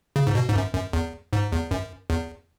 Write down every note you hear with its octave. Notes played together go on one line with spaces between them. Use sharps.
C#3
G#2
B2
G#2
F#2
F#2
E2
G#2
E2
F#2
E2